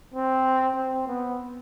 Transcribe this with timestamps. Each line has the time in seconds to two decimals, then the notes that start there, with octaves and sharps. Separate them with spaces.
0.14 C4
0.76 C4
1.07 B3